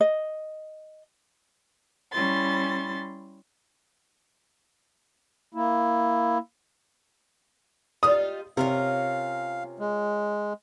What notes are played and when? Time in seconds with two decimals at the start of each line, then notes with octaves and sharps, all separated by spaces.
0.01 D#5
2.11 G3 C#4 E4 C6 A6
5.54 A#3 E4
8.03 G3 D#4 F4 D#6
8.57 C3 C#4 F4 A#4 F5
9.79 G#3